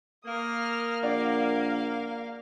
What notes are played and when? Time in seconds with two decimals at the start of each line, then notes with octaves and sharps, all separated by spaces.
0.25 A#3 D#6 F6
1.03 A#1 D5 F5 F#5 D6